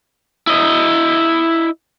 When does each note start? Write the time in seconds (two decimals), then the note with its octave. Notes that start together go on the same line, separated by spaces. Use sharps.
0.47 E4 D#5